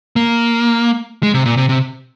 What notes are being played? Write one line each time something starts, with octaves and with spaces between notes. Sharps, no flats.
A#3
G#3
C3
A#2
C3
C3